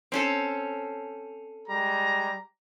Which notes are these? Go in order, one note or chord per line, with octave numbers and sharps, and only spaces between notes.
C4 C#4 A4
G3 G#3 A#5